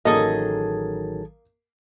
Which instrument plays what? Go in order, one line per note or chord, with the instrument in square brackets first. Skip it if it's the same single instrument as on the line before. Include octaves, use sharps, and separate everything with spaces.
[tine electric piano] A1 D#3 F#3 [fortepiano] A#3 D#6 [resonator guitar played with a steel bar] G#4 A4 D#5